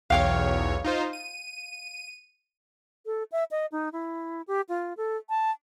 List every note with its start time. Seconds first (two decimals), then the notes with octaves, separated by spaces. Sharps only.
0.10 B1 E2 C#5 F5 G5 F6
0.84 D#4 F4 C5
1.13 D#7
3.06 A4
3.32 E5
3.51 D#5
3.72 D#4
3.92 E4
4.47 G4
4.69 F4
4.97 A4
5.29 A5